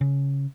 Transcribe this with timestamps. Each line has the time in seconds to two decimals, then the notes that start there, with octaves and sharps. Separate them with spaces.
0.01 C#3